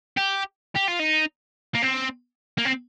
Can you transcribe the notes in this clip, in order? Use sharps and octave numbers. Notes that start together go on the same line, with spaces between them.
G4
G4
F4
D#4
A#3
C4
A#3
C4